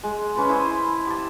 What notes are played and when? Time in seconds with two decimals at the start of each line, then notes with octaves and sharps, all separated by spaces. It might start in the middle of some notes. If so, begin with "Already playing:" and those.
0.04 G#3
0.36 C#4 B4 A5 C6
0.49 E4 C5 D#5
1.07 G4 A5